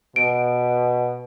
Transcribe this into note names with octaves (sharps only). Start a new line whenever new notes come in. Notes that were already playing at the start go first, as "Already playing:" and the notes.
B2 D7